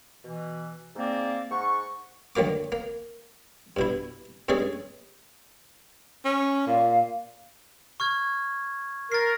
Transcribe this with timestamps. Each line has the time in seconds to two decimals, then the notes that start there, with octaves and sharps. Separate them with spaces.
0.25 B2 E3
0.96 G#2 A#3 C4 D5
1.50 G#2 F#5 C#6
2.36 D2 D#3 F#3 A#3 D6
2.72 A#3
3.77 G2 B2 E4
4.49 G2 G#3 C#4 G#4 A4
6.25 C#4
6.67 A#2 F5
8.00 C#6 F6 G#6
9.12 A#4 A6 C7